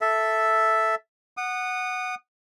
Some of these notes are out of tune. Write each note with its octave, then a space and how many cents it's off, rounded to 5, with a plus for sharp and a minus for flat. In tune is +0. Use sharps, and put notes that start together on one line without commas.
A4 +0 E5 +0
F#5 +0 D#6 -25